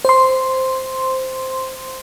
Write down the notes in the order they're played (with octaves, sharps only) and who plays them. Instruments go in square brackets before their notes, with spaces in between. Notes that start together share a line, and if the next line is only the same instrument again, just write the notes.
[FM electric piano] C5 C6